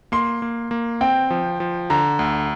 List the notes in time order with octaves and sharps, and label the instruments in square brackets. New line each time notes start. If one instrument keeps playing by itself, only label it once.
[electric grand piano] A#3 [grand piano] C6
[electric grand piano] A#3
A#3
[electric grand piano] C4 [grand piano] G5
[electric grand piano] F3
F3
[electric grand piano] D3 [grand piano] A#5
[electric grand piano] D2